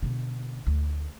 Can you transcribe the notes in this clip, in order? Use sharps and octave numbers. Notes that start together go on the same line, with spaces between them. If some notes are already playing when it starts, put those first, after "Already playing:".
B2 D3
D2